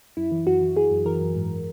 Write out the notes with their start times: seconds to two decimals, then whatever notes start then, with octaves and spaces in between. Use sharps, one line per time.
0.17 F#2 E4
0.32 E3
0.47 F#2 F#4
0.61 E3
0.77 E3 G#4
0.91 F#2
1.06 E3 A#4
1.21 F#2
1.36 G#2